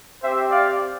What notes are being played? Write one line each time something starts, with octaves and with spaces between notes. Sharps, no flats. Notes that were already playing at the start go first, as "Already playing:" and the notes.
C4 G4 C5 E5
D5 F5